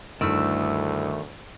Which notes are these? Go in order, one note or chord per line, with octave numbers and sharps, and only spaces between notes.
D2 G2 D#3 A3 E4 E6